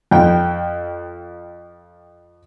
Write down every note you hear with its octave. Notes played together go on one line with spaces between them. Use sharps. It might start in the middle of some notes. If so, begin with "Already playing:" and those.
F2 G5